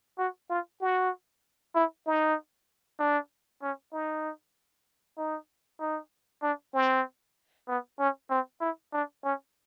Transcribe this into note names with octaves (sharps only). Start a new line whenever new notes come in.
F#4
F4
F#4
E4
D#4
D4
C#4
D#4
D#4
D#4
D4
C4
B3
C#4
C4
E4
D4
C#4